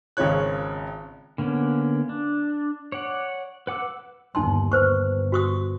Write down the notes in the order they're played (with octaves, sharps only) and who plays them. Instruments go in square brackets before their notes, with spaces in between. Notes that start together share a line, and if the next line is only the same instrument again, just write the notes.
[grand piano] G#1 C#3 F4 C#5 F#6
[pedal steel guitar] D3 A#3 B3 C#4
D4
C#5 D5 F#5
B4 F#5 D6 E6
[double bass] G1 D#2 [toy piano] D#4 A5 C6
[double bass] G1 [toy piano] B4 C5 C#6
[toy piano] F#4 C#6 D#6